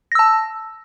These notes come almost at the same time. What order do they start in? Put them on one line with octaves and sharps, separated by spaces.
A#6 E6 A5